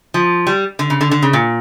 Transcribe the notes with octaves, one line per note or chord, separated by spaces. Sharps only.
F3
G3
D3
C#3
D3
D3
C#3
A#2